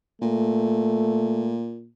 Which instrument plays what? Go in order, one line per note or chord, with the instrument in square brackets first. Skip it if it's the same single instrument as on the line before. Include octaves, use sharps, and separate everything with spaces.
[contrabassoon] A#2 [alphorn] A3